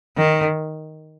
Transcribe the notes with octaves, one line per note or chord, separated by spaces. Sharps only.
D#3